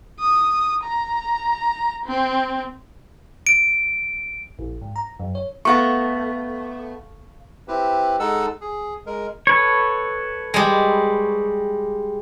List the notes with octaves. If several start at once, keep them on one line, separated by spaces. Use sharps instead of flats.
D#6
A#5
C4
D7
A#1
G#2
A#5
F#2
C#5
A3 B3 A4 F5 A#5 C#6
C4 E4 G4 B4
G#3 D#4 A4 F#5 E6
G#4
G#3 A#4
A4 B4 C#5
G3 G#3